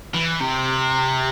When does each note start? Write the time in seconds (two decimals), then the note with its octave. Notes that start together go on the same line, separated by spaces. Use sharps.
0.14 E3
0.40 C3